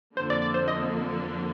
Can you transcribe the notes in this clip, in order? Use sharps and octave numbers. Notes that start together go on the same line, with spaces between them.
F2 D3 F3 A#3 C5
D5
D5
C5
D#5